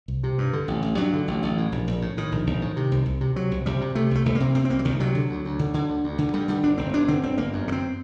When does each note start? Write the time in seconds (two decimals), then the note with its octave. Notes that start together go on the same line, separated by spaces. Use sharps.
0.08 C2
0.23 C3
0.38 G2
0.53 D3
0.68 A1
0.82 A1
0.97 G2 F#3
1.13 D3
1.28 A1
1.43 A1
1.58 A2
1.72 A#1
1.87 A#1
2.02 A2
2.17 A2 D#3
2.32 A#1
2.47 A#1
2.62 A2
2.76 C3
2.92 C2
3.06 C2
3.21 C3
3.36 C3 F#3
3.51 C2
3.66 C2 G3
3.81 C3
3.95 C3 A3
4.11 C2 A3
4.26 C2 A3
4.35 A#3
4.40 C3
4.55 C3 C4
4.65 C4
4.70 C2 A#3
4.79 F#3
4.85 C2 D#3
5.00 C3 F#3
5.15 D3
5.30 D2
5.45 D2
5.59 D3
5.74 D3
5.89 D2
6.04 D2
6.18 D3
6.34 G2 G3
6.48 D3 G3
6.63 G1 D4
6.78 G1 C4
6.93 G2 D4
7.08 D3 C4
7.23 G1 C4
7.38 G1 A#3
7.53 F#2
7.68 D3
7.72 C4